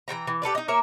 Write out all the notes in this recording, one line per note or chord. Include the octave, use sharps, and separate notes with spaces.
E3 F4 G5 A#5
E3
G4 A4 B4 D5
D#4 D#5
A#3 A#4 C#5 E5